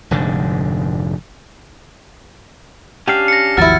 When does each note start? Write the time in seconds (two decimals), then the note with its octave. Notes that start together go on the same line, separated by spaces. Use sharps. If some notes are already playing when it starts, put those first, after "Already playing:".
0.11 F1 G#2 D3
3.08 C#4 D4 G4 F5
3.28 A#6 C#7
3.57 G#1 D#2 F3 F#3 E4 F6 A6